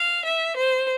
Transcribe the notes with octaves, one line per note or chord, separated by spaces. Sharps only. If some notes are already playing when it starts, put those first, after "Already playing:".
Already playing: F5
E5
C5